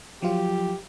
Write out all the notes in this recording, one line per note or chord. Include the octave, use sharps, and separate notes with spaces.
F3 F#3 F4 G4